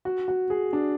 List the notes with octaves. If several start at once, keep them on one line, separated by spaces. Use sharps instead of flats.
F#4
F#4
G#4
D4